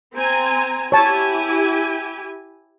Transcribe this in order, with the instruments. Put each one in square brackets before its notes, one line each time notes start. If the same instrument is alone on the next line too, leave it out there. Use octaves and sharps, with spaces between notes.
[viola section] C4 G#5 A#5
[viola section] E4 G4 G#5 [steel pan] C#5 A5